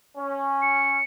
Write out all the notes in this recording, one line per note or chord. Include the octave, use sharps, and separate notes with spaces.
C#4
C#7